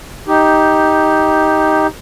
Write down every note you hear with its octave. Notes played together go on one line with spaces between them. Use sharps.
D#4 G4